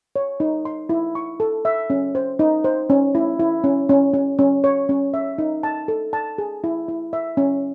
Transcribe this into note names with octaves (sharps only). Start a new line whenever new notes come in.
C#5
D#4
C6
E4
C#6
A4
E5
C#4
C5
D#4
C5
C#4
E4
E4
C#4
C#4
C#4
C#4
C#5
C#4
E5
D#4
A5
A4
A5
G#4
E4
E4
E5
C#4